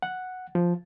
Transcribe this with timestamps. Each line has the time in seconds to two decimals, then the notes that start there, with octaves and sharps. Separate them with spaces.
0.02 F#5
0.55 F3